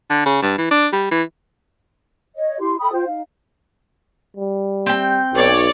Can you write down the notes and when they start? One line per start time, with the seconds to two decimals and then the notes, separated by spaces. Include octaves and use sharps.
0.10 D3
0.26 C#3
0.42 G2
0.58 E3
0.71 D4
0.93 G3
1.12 E3
2.35 C#5 D#5
2.60 E4 G4 C6
2.79 A4 G5 B5 D#6
2.92 F4 C5 G5
3.06 D#4 F5
4.37 G3
4.86 C4 G5
5.34 B1 C#5 D5